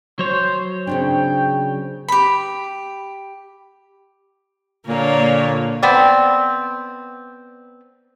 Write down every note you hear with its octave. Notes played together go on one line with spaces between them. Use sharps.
F#3 C5 C#5
C#3 C4 D4 G5
G4 B5
A#2 D3 A#3 C#5
B3 C4 D5